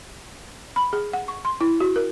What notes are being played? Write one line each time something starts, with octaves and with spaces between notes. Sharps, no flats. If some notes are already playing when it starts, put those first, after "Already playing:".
B5
G#4
F#5
C#6
C6
E4
F#4
A#4